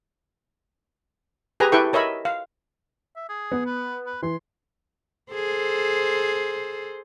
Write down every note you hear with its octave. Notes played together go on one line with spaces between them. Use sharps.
G4 G#4 B4 G#5 A#5
E4 G4 A4 B4 G5 C#6
A#4 C#5 D#5 E5 B5
F5
E5
G#4
B3
B4
B4
E3 C6
G#4 A4 C5